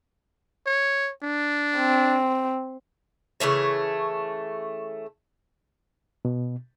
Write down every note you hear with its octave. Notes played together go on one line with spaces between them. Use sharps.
C#5
D4
C4
C#3 E3 A3 C#5
B2